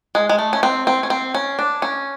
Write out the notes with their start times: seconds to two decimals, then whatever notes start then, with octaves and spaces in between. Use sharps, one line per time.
0.15 G#3
0.29 G#3
0.38 A3
0.53 C#4
0.63 C4
0.87 C4
1.03 C#4
1.10 C4
1.34 C#4
1.59 D4
1.82 C#4